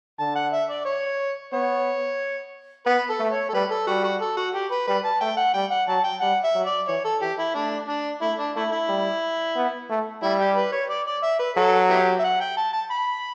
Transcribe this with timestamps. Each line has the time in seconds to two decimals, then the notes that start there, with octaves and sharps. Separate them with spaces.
0.19 D3 A5
0.36 F#5
0.53 E5
0.69 D5
0.86 C#5
1.53 B3 C#5
2.86 B3 B4
3.10 A4
3.20 A3
3.31 C#5
3.49 A4
3.53 G3 B4
3.71 A4
3.87 G3 F#4
4.04 F#4
4.21 A4
4.37 F#4
4.54 G4
4.71 B4
4.87 G3 B4
5.05 A5
5.21 A3 G5
5.37 F#5
5.54 G3 G5
5.71 F#5
5.88 F#3 A5
6.04 G5
6.21 G3 F#5
6.44 E5
6.55 F#3
6.66 D5
6.88 E3 C#5
7.05 A4
7.21 E3 G4
7.39 E4
7.55 A3 D4
7.88 D4
8.22 A3 E4
8.39 D4
8.56 A3 E4
8.72 E4
8.89 G3
9.56 B3
9.89 A3
10.22 G3 E4
10.40 G4
10.57 B4
10.73 C#5
10.90 D5
11.06 D5
11.23 E5
11.39 B4
11.57 F#3 A4
11.90 B3 E4 G4
12.19 E5
12.24 F#5
12.40 G5
12.57 A5
12.73 A5
12.91 B5